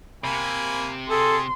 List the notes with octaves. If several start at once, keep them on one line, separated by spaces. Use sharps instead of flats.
C3 A#3 G#5 B5
G#4 A4 C6